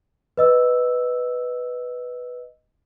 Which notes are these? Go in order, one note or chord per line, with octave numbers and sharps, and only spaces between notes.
B4 D#5 E6